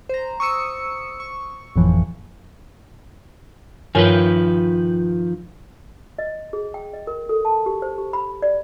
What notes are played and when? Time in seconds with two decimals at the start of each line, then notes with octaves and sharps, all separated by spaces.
0.09 C5 A#5
0.40 C#6 D#6 E6 C#7
1.20 C#6
1.76 G1 F2 A2 E3 F3
3.95 G2 D#3 F3 A#4 B4 C#5
6.18 D#5
6.53 G#4
6.74 G5
6.93 D#5
7.07 A#4
7.29 A4
7.45 A5
7.66 G4
7.82 C5
7.98 G4
8.13 B5
8.42 D5